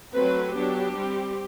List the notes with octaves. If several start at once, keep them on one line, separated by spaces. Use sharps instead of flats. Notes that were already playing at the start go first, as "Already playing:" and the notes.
F#3 A3 C4 B4
F#3 B3 D4 G4
G3 C4